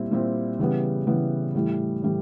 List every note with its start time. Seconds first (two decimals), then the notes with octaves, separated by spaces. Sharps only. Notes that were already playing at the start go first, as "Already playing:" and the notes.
Already playing: A#2 G3 C4 E4
0.11 A#2 G3 C4 E4
0.59 C#3 E3 G3 B3
1.07 C#3 E3 G3 B3
1.54 A2 E3 G3
2.02 A2 E3 G3